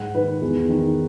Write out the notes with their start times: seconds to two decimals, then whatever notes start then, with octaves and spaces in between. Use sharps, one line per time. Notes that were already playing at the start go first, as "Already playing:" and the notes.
Already playing: G#2 F#5
0.15 D#3 B4
0.42 E2
0.69 D#3